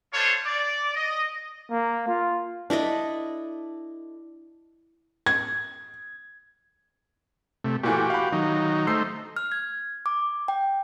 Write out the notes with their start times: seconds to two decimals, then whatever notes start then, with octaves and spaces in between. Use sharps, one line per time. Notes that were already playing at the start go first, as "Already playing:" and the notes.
0.13 D4 F4 A4 C5 C#5
0.45 D5
0.95 D#5
1.71 A#3
2.08 F4
2.70 D4 E4 A4 D#5
5.26 G#6
7.64 C3 A3
7.83 A#2 E3 A3 F#4 G4
8.10 F5 B5
8.32 D#3 F#3 D#4
8.87 A3 D#4 C5 E6 C7
9.36 F6
9.52 G#6
10.06 D6
10.48 G5